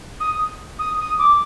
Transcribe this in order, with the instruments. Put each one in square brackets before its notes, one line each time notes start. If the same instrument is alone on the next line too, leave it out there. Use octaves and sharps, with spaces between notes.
[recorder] D#6
D#6
D#6
D6